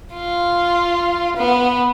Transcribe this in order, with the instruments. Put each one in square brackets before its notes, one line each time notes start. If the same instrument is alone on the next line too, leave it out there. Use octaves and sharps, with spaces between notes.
[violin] F4
B3